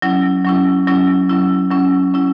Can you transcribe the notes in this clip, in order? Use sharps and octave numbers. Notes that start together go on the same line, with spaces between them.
F#3 C#4 E4
F#3 C#4 E4
F#3 C#4 E4
F#3 C#4 E4
F#3 C#4 E4
F#3 C#4 E4